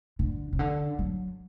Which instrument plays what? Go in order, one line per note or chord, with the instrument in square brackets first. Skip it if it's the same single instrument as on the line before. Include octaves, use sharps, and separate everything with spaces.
[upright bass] D3
C#3
D3
F#3